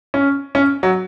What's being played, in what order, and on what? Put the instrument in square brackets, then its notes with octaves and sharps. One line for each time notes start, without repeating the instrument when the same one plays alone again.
[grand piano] C#4
C#4
F#3